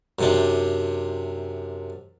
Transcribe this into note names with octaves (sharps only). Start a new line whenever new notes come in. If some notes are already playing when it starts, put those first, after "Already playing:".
F#2 C3 D4